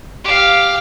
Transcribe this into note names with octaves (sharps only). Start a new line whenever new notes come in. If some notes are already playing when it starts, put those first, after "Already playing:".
G4 F5